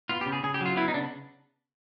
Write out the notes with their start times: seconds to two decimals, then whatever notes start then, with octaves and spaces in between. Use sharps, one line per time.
0.09 B3 F4
0.21 G4
0.26 C#3
0.33 G#4
0.44 C#3 G#4
0.54 G4
0.61 F#3 F4
0.76 B3 E4
0.88 D#4
0.94 C#3 D4